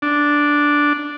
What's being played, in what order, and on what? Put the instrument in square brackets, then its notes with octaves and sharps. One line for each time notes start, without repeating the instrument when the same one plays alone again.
[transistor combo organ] D4